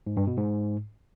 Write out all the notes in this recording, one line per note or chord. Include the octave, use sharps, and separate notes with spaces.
G#2
G2
B2
G#2